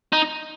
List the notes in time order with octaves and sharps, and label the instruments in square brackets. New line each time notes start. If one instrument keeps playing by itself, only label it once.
[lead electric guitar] D#4